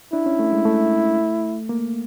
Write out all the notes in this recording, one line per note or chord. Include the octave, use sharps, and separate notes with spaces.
D4 E4
C#4
A3
G#3
A3
A#3